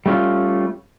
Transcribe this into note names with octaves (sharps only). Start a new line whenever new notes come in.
G3 A3 C#4 E4 F4